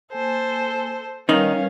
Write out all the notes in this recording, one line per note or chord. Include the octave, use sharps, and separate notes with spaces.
A#3 A4 C5 G#5
D#3 G3 C#4 D#4 A#4 B4 F5